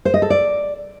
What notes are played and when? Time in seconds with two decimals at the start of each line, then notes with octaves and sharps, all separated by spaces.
0.05 C5
0.14 D#5
0.22 A4
0.30 D5